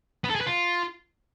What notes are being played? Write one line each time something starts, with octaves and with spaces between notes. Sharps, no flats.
B3
A4
G#4
B4
F4